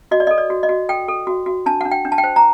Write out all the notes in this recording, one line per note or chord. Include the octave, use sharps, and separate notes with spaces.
F#4 D#5
D5
D#5
A4
D5
F#4
D#5
F#4
A4 G5
A4
F#4
F#4
D4 A5
D4 F#5
G5
D4
A5
G5
C5
A#5